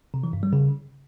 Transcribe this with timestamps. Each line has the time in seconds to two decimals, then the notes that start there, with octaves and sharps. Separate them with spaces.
0.14 C3
0.24 E3
0.33 G2
0.43 G3
0.53 C#3